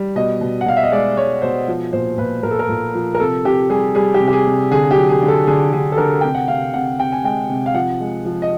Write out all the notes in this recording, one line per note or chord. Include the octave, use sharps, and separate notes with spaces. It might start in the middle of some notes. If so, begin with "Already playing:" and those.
Already playing: G3
B2 D#5
B2
F#5
B2 F5
E5
D#5
G#3 D5
G#3 C#5
B2 C5
F3
A#2 C5
A#2 B4
A#2 A#4
A4
A#4
A#2
F3
A#4
C3 A4
C3 G4
G3 G#4
G3 G#4
G4
C3
G4
G#4
C3
D3 G#4
G4
F#3
G#4
D3
A4
D3 G#4
D3 G#4
A4
D3 A#4
C3 G5
F#5
C3 F5
C3 F#5
C3 G5
G#5
G#3 G5
C3
F5
F3 F#5
G#3
F3
D#5